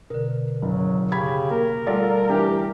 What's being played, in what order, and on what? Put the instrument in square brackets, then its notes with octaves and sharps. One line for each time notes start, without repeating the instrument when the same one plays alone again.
[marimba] B2 D3 [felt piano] A#4
[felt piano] F#1 [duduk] F#3
[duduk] C#3 [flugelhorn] G4 [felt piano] B5 G#6
[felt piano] A#3 [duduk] A#4
[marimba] G3 A3 [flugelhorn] F4 [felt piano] A4 D5 F#5
[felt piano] E3 D4 [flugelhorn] G4